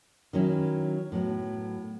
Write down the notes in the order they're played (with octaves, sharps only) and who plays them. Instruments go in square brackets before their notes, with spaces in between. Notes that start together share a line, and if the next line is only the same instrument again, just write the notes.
[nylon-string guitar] D#3 F#3 C#4 E4
A2 F#3 B3